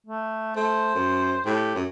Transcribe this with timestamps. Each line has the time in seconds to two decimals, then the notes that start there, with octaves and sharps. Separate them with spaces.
0.06 A3
0.56 A3 C5
0.95 F#2
1.46 A2 G4
1.75 F#2